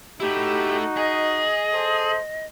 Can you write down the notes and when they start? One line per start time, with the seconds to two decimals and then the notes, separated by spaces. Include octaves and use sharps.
0.20 A3 D#4 E4 F#4 G4
0.97 G#4 D#5
1.73 A4 C5